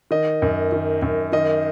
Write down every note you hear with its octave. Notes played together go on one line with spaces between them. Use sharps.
D#3 D#5
F#2
D#3
F#2
D#3 D#5